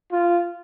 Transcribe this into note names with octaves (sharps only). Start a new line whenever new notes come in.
F4